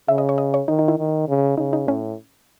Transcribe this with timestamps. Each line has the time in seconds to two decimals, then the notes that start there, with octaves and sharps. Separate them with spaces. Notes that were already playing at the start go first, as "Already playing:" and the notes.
0.08 C#3 E5
0.18 D#5
0.29 C#5
0.38 D#5
0.54 C#5
0.68 D#3 D#4
0.79 D#4
0.88 E4
0.98 D#3
1.28 C#3
1.58 C#3 D#4
1.73 D#4
1.88 A2 C#4